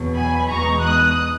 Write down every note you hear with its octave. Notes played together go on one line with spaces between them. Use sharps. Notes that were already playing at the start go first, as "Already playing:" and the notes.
Already playing: E2 B2 F#3
G#5 B5
E2 B2 G#3 D#4 A#5 C#6
D#6 F#6